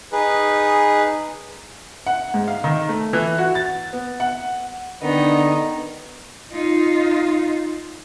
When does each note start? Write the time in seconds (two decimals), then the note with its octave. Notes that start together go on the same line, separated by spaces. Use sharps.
0.12 D#4 G#4 B4
2.07 F#5
2.34 G#2
2.48 F5
2.64 D#3
2.89 A3
3.13 E3
3.38 F#4
3.55 A6
3.93 B3
4.20 F#5
5.02 D3 D#3 B3 D#4
6.52 D#4 F4